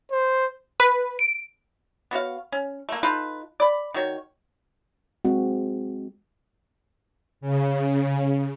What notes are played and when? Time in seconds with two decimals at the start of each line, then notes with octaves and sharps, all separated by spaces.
0.11 C5
0.80 B4
1.19 D7
2.11 B3 F#4 C#5 F5
2.52 C#4
2.89 A3 A#3
3.03 D#4 F4 A4 B4
3.60 D5 B5
3.94 D#3 F#4 C#5
5.25 G#3 C4 F#4
7.41 C#3